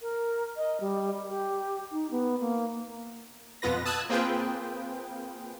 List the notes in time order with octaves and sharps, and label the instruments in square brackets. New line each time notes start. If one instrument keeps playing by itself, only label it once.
[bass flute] A#4
D#5
G3
G4
D#4
B3
A#3
[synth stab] F2 B2 B3 F4 B4 A#6
A5 D#6 E6 F#6 G#6
A#3 C4 F4 G#4 B4 G5